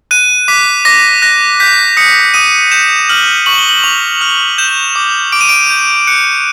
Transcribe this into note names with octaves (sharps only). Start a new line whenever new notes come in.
F#6 D#7
D6 B6
D6 A#6
F#6 A#6
G6 B6
D#6 C#7
D#6 D#7
G6 E7
F6 F#7
C#6 F#7
G7
F#7
C#6 F7
F6
G6 E7
D6
D6 D7
D#7
D7
G6
F#6 C#7